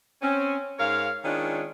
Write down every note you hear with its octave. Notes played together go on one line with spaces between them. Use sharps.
C4 C#4
G#2 A#4 C#5 F5
D#3 G#3 C#4 D4 F4